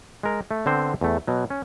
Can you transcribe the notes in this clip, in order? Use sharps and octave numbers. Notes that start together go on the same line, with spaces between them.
G#3 A#4
A3
D3 B3 C4 C5
E2 A3
B2 F#3
C#4